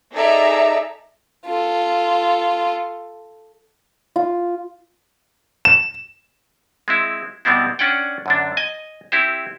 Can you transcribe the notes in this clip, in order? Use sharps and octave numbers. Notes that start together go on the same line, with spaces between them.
D#4 G#4 A4 D5 E5 A#5
F4 A4
F4
E7
G#3 C4 E4
B2 G3 B3 C4 E4
C#4 D4 D5 F#5 G5
F#2 D3 D4
D#5 G#5
C4 E4 G4 C5